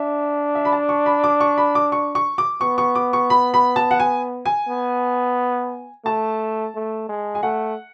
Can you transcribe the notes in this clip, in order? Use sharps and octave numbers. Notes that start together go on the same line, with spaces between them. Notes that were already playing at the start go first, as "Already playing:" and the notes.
Already playing: D4 E5
E5
B5
A5
C#6
B5
D6
C#6
B5
D6
C#6
C#6
D6
B3 C#6
C#6
D6
C#6
B5
B5
A5
F#5
G#5
G#5
B3
A3 A5
A3
G#3
G#5
A3 F#5